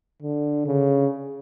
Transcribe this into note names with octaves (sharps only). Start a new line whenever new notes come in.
D3
C#3